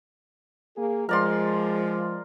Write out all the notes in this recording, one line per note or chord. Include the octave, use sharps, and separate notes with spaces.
A#3 G#4
F3 G#3 A#4 D5 C6